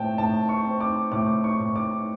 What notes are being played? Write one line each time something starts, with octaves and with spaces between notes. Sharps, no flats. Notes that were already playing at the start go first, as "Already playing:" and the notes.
Already playing: A2 C4 G5 A5
A2 A5
C#6
C4
D6
A2 D6
C#6
A2
D6